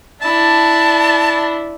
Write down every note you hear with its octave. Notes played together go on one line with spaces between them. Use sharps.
D4 E4 A5